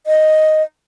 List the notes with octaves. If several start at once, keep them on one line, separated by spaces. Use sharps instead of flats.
D#5